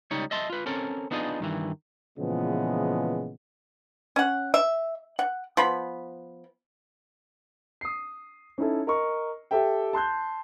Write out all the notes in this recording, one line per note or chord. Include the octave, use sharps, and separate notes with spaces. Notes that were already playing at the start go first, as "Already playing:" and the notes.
C#2 G3 D#4 C#5
D#5 E5 A5 C6
F4 B4
C4 C#4 A4 A#4
B3 D4 D#4 F4 G#4
G2 D#3 E3
A#2 C#3 E3 F3 G#3 B3
C#4 F#5
E5
F#5
F3 B3 B5
D#6 C7
C#4 D#4 E4 A4
A#4 D#5 C#6
G4 A4 E5 G5
A5 C6 F#6 G6